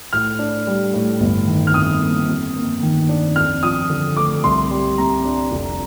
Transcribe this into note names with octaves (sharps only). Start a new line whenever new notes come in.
A2 F6
D4
G3
A2
G1
D#3
F6
F2 D#6
A#3
F2
A#3
D#3
D4
F2 F6
F3 D#6
D3
A3 D6
C2 C6
G3
C3 A#5
D4
F1